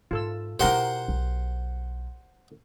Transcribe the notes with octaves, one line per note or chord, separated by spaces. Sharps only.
G#2 F4 A4 E6
B2 E4 G4 A#4 C5 F#5 C6
B1